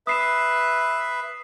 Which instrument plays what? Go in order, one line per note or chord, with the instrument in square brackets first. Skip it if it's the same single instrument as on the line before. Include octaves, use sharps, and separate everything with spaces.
[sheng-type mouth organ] B4 E5 [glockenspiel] D#6 C7 E7